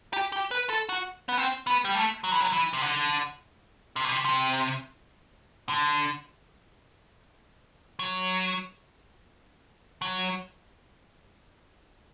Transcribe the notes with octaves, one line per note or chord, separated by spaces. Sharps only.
G4
G4
B4
A4
F#4
B3
C4
B3
G3
A3
F#3
E3
F#3
E3
C3
D3
C3
B2
C3
C3
D3
F#3
F#3